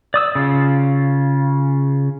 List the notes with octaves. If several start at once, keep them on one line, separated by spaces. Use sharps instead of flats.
D5 D#6 E6
C#3 F4